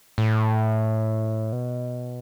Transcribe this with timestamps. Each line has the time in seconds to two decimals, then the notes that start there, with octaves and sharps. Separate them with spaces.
0.18 A2
1.52 B2